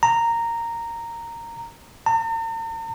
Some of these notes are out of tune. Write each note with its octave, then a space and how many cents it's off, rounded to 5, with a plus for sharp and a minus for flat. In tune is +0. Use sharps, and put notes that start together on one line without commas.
A#5 -10
A#5 -45